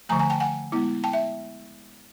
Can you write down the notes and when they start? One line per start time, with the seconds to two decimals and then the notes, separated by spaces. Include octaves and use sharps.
0.09 D3 F3 A3 G#5 A#5
0.19 G#5 A#5
0.30 G5 A5
0.40 F#5 G#5
0.72 G#3 B3 E4
1.04 G5 A5
1.13 E5